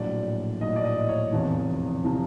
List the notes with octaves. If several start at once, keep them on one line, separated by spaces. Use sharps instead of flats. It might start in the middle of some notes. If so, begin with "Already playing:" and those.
Already playing: A#1 A2 F#3 D5
A#1 A2 F#3 D#5
D5
D#5
C#5
F1 E2 C3 F3
C3 F3